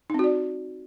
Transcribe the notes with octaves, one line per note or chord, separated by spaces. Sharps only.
C4 D#4 F#4 D5